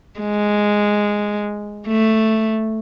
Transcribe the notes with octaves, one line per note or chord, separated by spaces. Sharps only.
G#3
A3